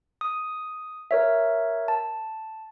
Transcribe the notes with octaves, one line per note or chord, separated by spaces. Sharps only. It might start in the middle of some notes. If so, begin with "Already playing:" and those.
D#6
A#4 C#5 E5
A5